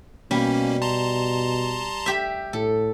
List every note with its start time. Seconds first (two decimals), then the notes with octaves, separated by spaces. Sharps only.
0.31 B2 G3 A#3 C#4
0.82 A5 A#5 C6
2.06 G4 E5
2.53 A2 A4